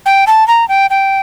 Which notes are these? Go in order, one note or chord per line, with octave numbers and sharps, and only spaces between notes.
G5
A5
A#5
G5
G5